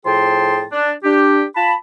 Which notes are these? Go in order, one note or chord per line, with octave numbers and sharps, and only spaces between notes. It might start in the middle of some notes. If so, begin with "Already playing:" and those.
A2 F3 G#4 G5 A5 C6
D4
D4 G4
F4 A5 B5